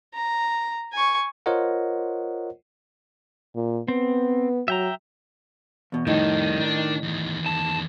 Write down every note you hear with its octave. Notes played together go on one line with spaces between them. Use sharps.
A#5
G#5 C#6
F4 A#4 C5 C#5 D#5 F#5
A#2
B3 C4
F#3 E5 G5 A#5
E2 B2
F2 A2 D#3 G3 D#4
D4
E2 D#3
A5